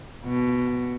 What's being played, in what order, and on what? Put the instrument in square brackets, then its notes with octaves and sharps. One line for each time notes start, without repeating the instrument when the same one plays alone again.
[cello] B2